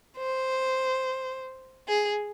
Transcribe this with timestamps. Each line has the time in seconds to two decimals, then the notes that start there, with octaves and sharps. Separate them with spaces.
0.18 C5
1.88 G#4